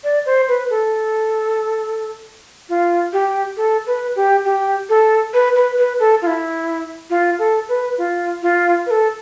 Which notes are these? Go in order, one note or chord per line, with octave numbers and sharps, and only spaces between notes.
D5
C5
B4
A4
F4
G4
A4
B4
G4
G4
A4
B4
B4
B4
A4
F4
E4
F4
A4
B4
F4
F4
B4
A4